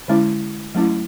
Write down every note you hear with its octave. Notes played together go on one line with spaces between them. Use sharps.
D3 G#3 C#4 E4
F#3 A3 C#4 E4